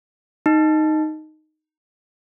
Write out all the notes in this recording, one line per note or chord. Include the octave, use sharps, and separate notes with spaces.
D#4